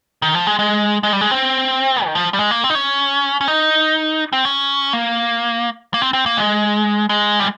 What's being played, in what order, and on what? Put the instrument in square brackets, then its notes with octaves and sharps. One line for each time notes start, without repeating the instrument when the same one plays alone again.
[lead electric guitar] D#3
F3
G#3
G#3
G#3
G3
G#3
C4
D#3
F3
G3
G#3
A#3
C4
D#4
C#4
C#4
D#4
C4
C#4
A#3
A#3
C4
C4
A#3
G#3
G#3
G3